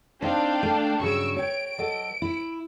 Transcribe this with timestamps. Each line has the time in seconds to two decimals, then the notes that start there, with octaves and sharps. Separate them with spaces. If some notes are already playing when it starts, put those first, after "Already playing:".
0.22 C4 D4 D#4 F5 G5
0.63 A3
1.00 G2 C#3 F#3 C#6 E6 D7
1.36 C#5 G5 D7
1.79 F#3 A4 D#5
2.22 E4